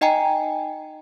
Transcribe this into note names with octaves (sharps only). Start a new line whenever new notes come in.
D#4 D#5 G5 G#5 A#5